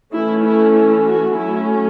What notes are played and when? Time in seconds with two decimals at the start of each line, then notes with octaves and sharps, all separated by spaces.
0.12 E3 A3 C#4 E4
0.44 E4
0.75 E4
1.05 F#4
1.35 F#3 A3 C#4 E4